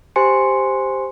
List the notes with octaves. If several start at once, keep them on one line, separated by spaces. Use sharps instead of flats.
G4 C5 G#5 C6 C#7